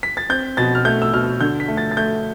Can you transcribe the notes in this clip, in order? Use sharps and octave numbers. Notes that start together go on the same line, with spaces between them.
B6
A6
C4 G6
B2 A6
F6
A3 G6
E6
B2 F6
D3 G6
B6
A3
A6
A6
A3 G6